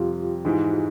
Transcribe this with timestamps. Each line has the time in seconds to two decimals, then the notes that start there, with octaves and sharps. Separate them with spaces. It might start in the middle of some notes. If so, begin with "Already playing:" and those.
Already playing: F2 C3 G3 F4 G4
0.45 G#2 E3 G#3